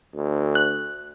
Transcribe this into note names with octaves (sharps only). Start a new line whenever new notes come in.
D2
F#6